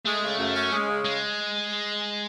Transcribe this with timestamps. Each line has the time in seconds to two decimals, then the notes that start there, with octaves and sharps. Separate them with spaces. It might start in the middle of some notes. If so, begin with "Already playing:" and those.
0.05 G#3 A3
0.22 C#3
0.38 F#2
0.55 C#4
0.71 G#3
0.88 C#3
1.05 G#3